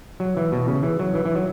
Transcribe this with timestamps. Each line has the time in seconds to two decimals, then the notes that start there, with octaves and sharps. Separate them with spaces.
0.20 F#3
0.37 E3
0.52 B2
0.68 C#3
0.83 E3
0.99 F#3
1.15 E3
1.25 E3
1.35 F#3